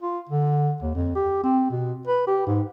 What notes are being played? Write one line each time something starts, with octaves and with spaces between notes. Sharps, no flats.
F4
D3
D#2
F2
G4
C4
B2
B4
G4
G#2